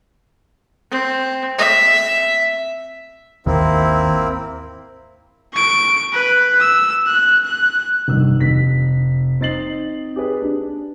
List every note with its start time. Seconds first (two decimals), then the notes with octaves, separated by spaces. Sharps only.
0.92 C4
1.58 E5
3.46 G#1 D#2 D#3 A#3 C4 E4
5.54 C#6 D7
6.13 B4
6.61 E6
7.07 F#6
7.44 F#6
8.08 F1 G2 D#3 E6
8.40 F1 B6
9.41 C4 D#4 A6 C7 F#7
10.16 G4 G#4 B4
10.42 D4